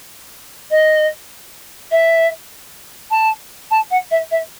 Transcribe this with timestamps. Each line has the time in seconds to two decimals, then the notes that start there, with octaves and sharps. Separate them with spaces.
0.71 D#5
1.91 E5
3.11 A5
3.71 A5
3.91 F#5
4.11 E5
4.31 E5